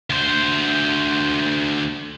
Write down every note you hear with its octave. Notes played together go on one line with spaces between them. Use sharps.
D2 C5